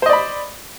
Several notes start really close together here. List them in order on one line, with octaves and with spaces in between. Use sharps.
C5 D#5 D5 B5